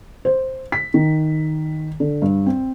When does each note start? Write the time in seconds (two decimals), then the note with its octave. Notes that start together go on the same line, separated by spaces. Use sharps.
0.25 C5
0.72 B6
0.94 D#3
2.00 D3
2.22 G2
2.46 C4